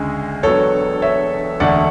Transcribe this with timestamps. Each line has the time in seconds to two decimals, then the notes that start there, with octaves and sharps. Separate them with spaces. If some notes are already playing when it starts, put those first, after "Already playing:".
Already playing: D2 C#3 G#3
0.43 E1 E2 D3 F#3 B3 A4 C#5
1.02 C#5 E5
1.60 E1 D2 D3 A3 D5 F#5